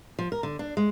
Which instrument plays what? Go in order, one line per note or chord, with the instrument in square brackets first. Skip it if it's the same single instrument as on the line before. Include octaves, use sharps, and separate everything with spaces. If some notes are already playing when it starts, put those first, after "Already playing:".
[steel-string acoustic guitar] F3
A#4
D3
D4
G#3